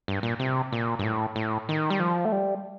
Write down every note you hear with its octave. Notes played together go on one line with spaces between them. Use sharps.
G2
A#2
C3
A#2
G2
A2
A2
D#3
G3
F3
A3
G3